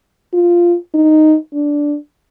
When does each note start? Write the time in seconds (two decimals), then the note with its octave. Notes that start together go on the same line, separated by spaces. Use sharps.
0.33 F4
0.94 D#4
1.54 D4